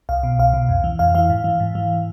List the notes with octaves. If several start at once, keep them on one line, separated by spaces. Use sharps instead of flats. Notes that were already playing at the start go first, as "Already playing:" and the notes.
C2 F5
B2
C2 F5
B2
F2
E3
F2 F5
E3 F5
G#2
E3
G#2
E3